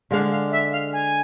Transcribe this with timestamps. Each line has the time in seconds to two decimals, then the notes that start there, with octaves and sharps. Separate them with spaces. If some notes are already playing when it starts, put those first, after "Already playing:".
0.10 D3 G#3 D4 F5
0.30 F5
0.51 E5
0.71 F5
0.92 G#5